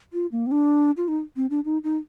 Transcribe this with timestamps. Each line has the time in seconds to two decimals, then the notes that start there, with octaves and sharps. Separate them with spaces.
0.13 F4
0.32 A#3
0.47 C4
0.51 D4
0.97 F4
1.08 D#4
1.36 C4
1.50 D4
1.65 D#4
1.84 D#4